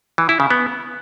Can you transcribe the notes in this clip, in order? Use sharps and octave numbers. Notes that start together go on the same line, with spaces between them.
E3
E4
C#3
B3